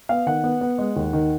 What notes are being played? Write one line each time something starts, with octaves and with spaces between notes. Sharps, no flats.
B3 F5
D#3 F#5
B3
B3
G#3
D#2
D#3